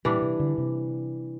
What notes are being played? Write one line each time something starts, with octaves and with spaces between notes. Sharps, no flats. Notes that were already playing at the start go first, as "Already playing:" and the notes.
A#2 E3 G3 D4
C3
D3
C3